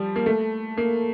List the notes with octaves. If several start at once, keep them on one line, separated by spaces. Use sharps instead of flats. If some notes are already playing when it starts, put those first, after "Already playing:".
Already playing: F3 G3
A#3
A3
A#3